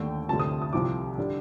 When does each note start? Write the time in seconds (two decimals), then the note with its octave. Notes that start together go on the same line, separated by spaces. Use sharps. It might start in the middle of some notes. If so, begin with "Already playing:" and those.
Already playing: D#2 D3 A3 G5
0.28 D2 C3 G3 A5
0.40 D#6
0.62 D#6
0.73 C2 C3 F3 D6
1.18 D3 G3 D4